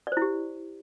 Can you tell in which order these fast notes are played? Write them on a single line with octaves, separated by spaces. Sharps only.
D5 C5 E4 G4